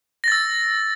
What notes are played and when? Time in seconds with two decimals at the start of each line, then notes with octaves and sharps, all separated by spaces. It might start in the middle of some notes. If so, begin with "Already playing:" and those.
0.24 A#6
0.28 A6
0.32 E6